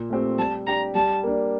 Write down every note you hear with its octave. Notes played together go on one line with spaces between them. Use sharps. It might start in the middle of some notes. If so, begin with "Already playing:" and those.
Already playing: A#2
A3 C4 G4
G3 A5
D4 G4 A#5
G3 A5
A#3 D4